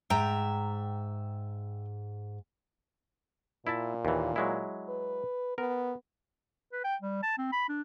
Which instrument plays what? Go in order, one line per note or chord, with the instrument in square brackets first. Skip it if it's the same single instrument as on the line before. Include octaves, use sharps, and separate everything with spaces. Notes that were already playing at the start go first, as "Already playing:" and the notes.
[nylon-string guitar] G#2 [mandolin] E5 G5 A#5
[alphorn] A#2 [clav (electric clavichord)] E4 E5 A5
[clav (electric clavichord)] D#2 E3
F#3 G#3 E4
[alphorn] B4
[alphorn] B3 [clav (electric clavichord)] A#4
[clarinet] B4
G5
G3
A5
C4
B5
D4